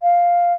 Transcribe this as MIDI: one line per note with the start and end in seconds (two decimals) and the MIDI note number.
0.02 0.53 77